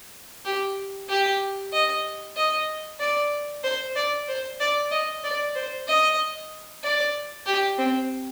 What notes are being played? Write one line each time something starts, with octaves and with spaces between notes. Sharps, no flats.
G4
G4
D#5
D#5
D5
C5
D5
C5
D5
D#5
D5
C5
D#5
D5
G4
C4